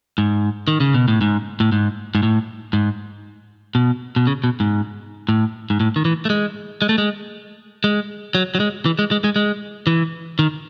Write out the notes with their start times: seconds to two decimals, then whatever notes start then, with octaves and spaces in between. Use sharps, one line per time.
0.18 G#2
0.68 D#3
0.80 C#3
0.94 B2
1.08 A2
1.21 G#2
1.60 A2
1.72 G#2
2.15 G#2
2.23 A2
2.73 G#2
3.75 B2
4.16 B2
4.27 C#3
4.44 B2
4.60 G#2
5.29 A2
5.70 G#2
5.80 A2
5.96 D#3
6.05 E3
6.25 A3
6.30 G#3
6.82 G#3
6.89 A3
6.98 G#3
7.84 G#3
8.35 F#3
8.55 F#3
8.60 G#3
8.86 E3
8.99 G#3
9.11 G#3
9.24 G#3
9.36 G#3
9.87 E3
10.39 D#3